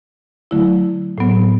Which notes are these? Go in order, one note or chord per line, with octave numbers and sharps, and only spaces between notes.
D3 F#3 A3 E4
A2 F#3 B3